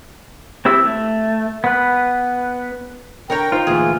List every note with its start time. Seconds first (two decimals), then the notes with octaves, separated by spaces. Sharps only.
0.65 C4 E4 G4 E6
0.84 A3
1.64 B3 B4
3.30 D3 A#4 C#5 G5 A#5
3.52 D#4 F4 C5
3.67 D2 A#2 E3 G#4